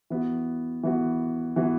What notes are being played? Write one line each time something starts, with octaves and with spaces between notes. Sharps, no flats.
E3 B3 F#4
E3 B3 F#4
E3 B3 F#4